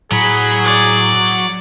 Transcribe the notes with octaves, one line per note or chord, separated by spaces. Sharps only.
A2 F#3 G#4 B5
D5